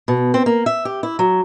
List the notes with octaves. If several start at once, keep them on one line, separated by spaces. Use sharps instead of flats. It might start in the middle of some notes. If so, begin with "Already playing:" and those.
B2
C4
A#3
E5
G4
E4
F#3